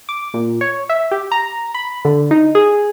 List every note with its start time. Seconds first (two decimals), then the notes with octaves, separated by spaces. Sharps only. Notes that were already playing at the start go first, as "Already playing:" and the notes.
0.09 D6
0.34 A#2
0.61 C#5
0.89 E5
1.11 G4
1.32 A#5
1.74 B5
2.05 D3
2.31 D#4
2.55 G#4